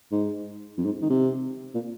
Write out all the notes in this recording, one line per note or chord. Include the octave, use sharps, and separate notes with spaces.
G#2
F2
G#2
D#3
C3
A#2